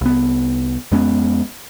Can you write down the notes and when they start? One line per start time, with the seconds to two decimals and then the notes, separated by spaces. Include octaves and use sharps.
0.01 C2 B3
0.92 F2 G#3 B3 C#4